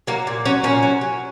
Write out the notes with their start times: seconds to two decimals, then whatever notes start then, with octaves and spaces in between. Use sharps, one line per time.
0.07 F#3 A#3
0.27 A#2
0.45 F#3 C#4
0.63 A#2 C#4
0.83 F#3
1.01 F#3